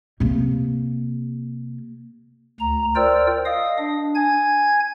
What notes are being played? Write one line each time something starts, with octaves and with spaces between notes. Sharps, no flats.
C3 A#3
D2 A#5
F4 A#4 C5 D5 G5 E6
D#5 F5 D#6
D4
G#5 G#6